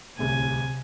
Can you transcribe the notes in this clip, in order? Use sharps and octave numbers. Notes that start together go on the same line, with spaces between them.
D1 C2 A2 C3 G#5